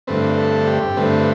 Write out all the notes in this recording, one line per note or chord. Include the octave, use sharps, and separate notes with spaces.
G2 D3 A3 C4 B4
A4
G4
G2 D3 A3 C4 B4